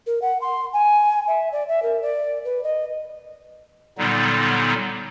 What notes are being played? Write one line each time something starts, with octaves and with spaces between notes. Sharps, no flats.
A#4
F#5
C6
G#5
E5
D5
E5
A#4
D5
B4
D#5
A#2 D3 F#3 G3 B3 D#4